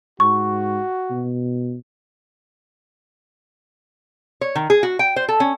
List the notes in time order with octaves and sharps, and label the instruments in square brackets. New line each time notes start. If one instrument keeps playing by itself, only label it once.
[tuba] G#2 [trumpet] F#4 [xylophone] C#6
[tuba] B2
[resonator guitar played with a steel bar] C#5
D#3
G#4
F#4
G5
C5
A4
C#4